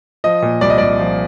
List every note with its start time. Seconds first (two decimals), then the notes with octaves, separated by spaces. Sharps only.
0.24 F3 D#5
0.42 A#2
0.61 C2 D5
0.70 D#5
0.78 C2 D5
0.99 F3